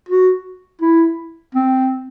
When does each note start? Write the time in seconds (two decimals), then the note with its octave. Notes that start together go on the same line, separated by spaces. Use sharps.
0.09 F#4
0.81 E4
1.55 C4